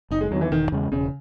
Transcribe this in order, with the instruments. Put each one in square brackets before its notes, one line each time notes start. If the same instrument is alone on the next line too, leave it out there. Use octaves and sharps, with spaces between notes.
[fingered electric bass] F#1 [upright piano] D#4
[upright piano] G#3
[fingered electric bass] E2 [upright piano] F#3
[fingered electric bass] D#3
[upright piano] E3
[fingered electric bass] E1 [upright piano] D#3
[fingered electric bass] E2 C#3 G#3
[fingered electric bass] E1 [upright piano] C#3